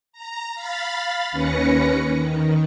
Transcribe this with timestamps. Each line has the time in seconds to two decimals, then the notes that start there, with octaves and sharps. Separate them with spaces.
0.13 A#5
0.55 F5 B5 A6
1.32 D#2 C#4 B4 A#6 C#7
2.13 D#3